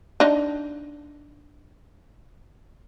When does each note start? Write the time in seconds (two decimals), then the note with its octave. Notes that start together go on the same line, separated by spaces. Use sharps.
0.20 D4 D#4